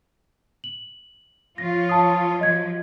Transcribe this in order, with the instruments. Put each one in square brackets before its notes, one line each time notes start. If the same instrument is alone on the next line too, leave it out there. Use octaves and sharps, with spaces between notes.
[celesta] F#7
[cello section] F3 F4 C#5 [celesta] A#6
[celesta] A5 D#6
[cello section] F3 F#3 [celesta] D#5 G#6